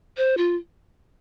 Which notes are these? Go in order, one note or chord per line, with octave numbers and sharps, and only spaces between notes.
C5
F4